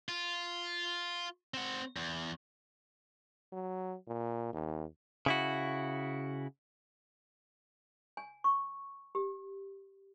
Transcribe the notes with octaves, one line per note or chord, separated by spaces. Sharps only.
F4
C4 F#5
E2
F#3
A#2
D#2
C#3 E4 F#4
G#5
C#6
G4